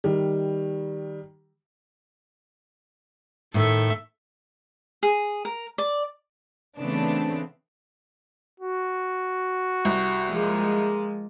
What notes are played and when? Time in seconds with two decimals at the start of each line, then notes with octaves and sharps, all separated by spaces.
0.04 D#3 G3
3.54 A2 D#3 A4 E5
5.03 G#4
5.45 A#4
5.78 D5
6.79 C#3 E3 A3 B3 C4 D4
8.60 F#4
9.85 C2
10.27 F3 G#3 A#3